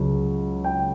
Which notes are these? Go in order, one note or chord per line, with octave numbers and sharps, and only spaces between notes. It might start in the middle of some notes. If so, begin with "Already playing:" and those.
Already playing: C#2 F#3
G5